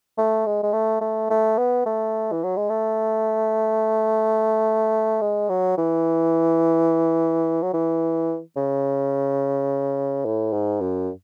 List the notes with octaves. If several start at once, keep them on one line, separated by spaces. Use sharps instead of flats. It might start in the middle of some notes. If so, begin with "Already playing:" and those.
A3
G#3
G#3
A3
A3
A3
B3
A3
E3
F#3
G#3
A3
G#3
F#3
E3
F#3
E3
C#3
A2
G#2
F#2